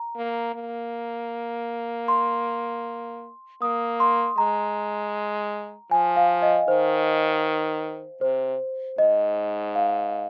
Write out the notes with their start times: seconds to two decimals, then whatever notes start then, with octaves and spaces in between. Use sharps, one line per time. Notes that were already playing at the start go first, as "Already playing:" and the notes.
Already playing: A#5
0.16 A#3
0.54 A#3
2.08 C6
3.61 A#3 D#6
4.00 C6
4.38 G#3 A#5
5.91 F3 G#5
6.17 F5
6.42 D#5
6.68 D#3 C5
8.21 C3 C5
8.98 G#2 D#5
9.75 F5